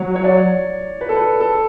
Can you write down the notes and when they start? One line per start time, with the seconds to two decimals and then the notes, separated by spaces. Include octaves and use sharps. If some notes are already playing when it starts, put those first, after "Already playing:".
Already playing: F#3 C#5
0.16 C#5
0.24 D5
1.01 B4
1.09 A4
1.16 B4
1.40 A4